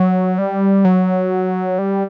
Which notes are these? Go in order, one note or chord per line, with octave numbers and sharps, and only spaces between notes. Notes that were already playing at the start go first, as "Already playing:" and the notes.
Already playing: F#3
G3
F#3
G3